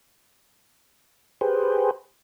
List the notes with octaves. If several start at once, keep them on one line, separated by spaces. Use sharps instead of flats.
G4 G#4 B4 C5